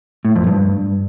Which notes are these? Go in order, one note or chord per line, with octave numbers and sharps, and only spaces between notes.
A2
F2
G2